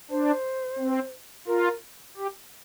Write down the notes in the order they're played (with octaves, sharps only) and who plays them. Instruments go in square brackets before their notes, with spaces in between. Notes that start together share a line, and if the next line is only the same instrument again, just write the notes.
[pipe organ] D4 [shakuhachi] C5
[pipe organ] C4
[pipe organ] F4 [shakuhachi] A#4
[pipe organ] G4